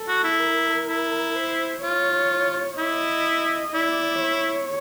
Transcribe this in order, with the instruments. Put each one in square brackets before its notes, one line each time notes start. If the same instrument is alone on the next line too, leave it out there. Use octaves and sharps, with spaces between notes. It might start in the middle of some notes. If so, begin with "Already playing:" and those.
Already playing: [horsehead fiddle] A4
[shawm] F#4
E4
[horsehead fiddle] A#4
[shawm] E4
[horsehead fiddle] C5
[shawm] F4 [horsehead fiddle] C#5
[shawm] E4 [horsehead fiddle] D#5
[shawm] E4 [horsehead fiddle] D5
[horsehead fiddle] C#5